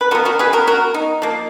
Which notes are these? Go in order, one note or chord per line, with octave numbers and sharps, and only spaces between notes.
B4
F3 B3 F#4 A#4
F#4 A#4
G#4 B4
F#4 A#4
F#4 A#4
D#4
F3 A#3